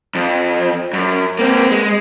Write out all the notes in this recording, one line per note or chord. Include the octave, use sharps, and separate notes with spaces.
F2
F#2
A#3 C4
G#3